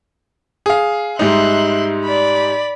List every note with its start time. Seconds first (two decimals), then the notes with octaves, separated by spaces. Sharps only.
0.66 G#4 F5
1.19 G#2 G3 D#4 E5 C6 F#6
2.07 D5 B5